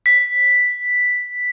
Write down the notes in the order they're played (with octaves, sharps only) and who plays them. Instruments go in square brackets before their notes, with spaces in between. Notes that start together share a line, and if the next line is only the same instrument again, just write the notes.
[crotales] B6